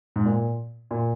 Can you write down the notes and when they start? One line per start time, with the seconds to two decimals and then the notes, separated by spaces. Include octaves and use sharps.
0.16 G#2
0.25 A#2
0.91 A#2